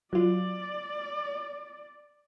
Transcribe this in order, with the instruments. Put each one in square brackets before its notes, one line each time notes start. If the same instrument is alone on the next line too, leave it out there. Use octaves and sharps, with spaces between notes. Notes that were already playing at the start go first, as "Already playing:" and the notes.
[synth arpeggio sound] F#3 F4 [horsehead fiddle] D5